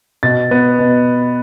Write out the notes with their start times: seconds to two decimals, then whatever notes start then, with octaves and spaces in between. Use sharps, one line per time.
0.23 B2 A6
0.51 B3
0.79 B2